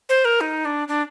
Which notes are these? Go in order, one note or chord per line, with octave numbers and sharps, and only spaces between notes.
C5
A#4
D#4
D4
D4